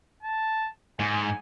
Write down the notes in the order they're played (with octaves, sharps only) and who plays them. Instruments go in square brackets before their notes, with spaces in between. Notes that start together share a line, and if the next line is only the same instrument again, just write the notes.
[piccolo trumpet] A5
[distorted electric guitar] G#2 [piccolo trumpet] G#5